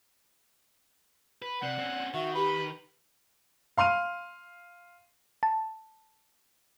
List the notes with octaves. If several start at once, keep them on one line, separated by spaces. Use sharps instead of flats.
B4
C3 D5 F#5
C4 C#4
D#3 F#4 E5
G4 B4 B5
F5 C6 F6 D#7
A5